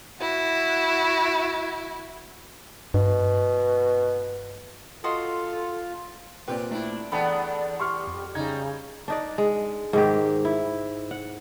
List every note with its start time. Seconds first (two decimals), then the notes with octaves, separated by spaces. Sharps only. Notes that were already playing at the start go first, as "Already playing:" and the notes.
0.20 E4 F#4
2.94 G2 B2
5.04 F4 F#4 A4 D#5 C6
6.48 A#2 C4 G4 B4 D5
6.71 A3 D4 E4
7.12 E2 B3 D4 A4 D5 G5 A5 B5
7.80 G4 C6 C#6 F6
8.07 F2
8.35 C#3 G3 D#4 G#6
9.08 D4 D#4 D5
9.38 G#3
9.93 G#2 D#3 G4
10.45 E4
11.11 F#5